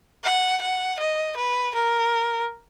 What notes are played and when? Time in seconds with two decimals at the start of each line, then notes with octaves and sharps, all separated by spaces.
0.24 F#5
0.61 F#5
0.99 D#5
1.36 B4
1.74 A#4